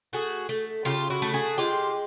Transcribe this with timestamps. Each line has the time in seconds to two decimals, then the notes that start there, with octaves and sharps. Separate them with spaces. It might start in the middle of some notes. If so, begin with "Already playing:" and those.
0.13 A3 F#4 G#4
0.49 A3
0.85 C#3 F4 G4
1.10 E4 F#4
1.22 A3
1.34 F#4 G#4
1.58 G#3 F4 G4